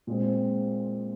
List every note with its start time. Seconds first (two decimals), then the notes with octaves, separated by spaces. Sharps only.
0.07 A#2 G#3 C4